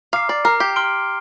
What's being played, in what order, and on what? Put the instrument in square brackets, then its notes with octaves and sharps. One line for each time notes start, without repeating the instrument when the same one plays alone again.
[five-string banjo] F5 [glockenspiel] A#5 D6 F6 C7
[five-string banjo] D5
[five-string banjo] A#4 [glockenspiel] A#5 D6 F6 C7
[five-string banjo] G4
[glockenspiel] C6 F6 D7 G7